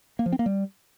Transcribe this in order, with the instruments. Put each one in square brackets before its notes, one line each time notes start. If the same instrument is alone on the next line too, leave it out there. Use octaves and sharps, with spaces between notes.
[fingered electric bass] A#3
F3
C4
A#3
G3